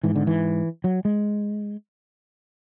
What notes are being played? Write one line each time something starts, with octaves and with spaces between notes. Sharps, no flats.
G#2 E3
D3
E3
F#3
G#3